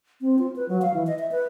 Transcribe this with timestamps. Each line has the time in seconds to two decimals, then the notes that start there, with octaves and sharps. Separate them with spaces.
0.21 C4
0.39 F4
0.56 B4
0.69 F#3
0.82 F5
0.94 E3
1.07 D#5
1.19 E5
1.32 B4